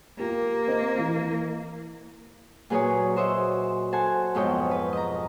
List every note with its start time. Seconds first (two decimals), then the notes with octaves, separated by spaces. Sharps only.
0.19 A#3 F4 G4
0.68 C4 D#5
0.99 E3
2.70 A#2 F#3 G#4 B4 C#5 D#6
3.16 F#4 C5 C#5 D#5 E5
3.92 A4 C5 F#5 G#5 A5
4.35 F2 G#2 B2 C#5 D#5 G5
4.71 B4
4.93 D#5 A#5